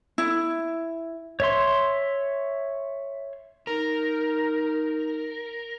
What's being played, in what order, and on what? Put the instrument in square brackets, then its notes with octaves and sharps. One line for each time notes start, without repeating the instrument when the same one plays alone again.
[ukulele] E4
[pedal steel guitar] C#5 E5 C6
[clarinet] D#4 [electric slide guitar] A#4